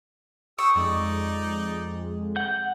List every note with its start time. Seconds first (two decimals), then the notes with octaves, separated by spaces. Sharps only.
0.59 G4 C#6 D#6 E6
0.75 F2 G#3 D#4 D5
2.36 F#5 G6